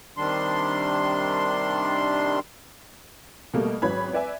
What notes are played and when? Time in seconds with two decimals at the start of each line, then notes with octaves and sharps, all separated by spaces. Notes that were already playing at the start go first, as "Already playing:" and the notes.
0.17 C3 D#3 G3 D4 C6
3.54 B2 G3 A3 A#3
3.82 G#1 F#3 C#4 B4 B5 G#6
4.13 B4 D5 E5 G#5